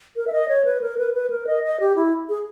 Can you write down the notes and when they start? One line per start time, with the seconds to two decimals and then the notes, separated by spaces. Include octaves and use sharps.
0.16 A#4
0.27 E5
0.32 D#5
0.48 C#5
0.65 B4
0.81 A#4
0.98 B4
1.14 B4
1.30 A#4
1.47 D#5
1.63 D#5
1.80 G4
1.96 E4
2.29 G#4